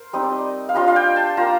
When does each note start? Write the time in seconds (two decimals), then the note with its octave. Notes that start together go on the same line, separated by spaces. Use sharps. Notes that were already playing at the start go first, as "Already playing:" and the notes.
Already playing: A#4 C5
0.13 G3 C4 D#4 D#5
0.23 D5
0.32 D#5
0.69 F5
0.75 G3 D4 F4 D#5
0.88 F5
0.96 G5
1.16 A5
1.37 A#3 F4 A#5